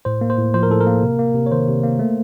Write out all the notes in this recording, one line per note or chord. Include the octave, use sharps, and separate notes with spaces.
A2 C5
A#3
C5
A2
F3 C5
A#4
A2 A4
A#4
A#3
C3
A#3
C3
C#5
D#3 C5
C3
A#3
A3